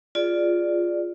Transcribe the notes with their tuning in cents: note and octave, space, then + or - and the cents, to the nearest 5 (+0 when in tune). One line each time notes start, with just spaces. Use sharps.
F4 +0 G#4 +0 D5 +5